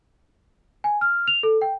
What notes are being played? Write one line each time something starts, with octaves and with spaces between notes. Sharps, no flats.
G#5
F6
F7
A4
G5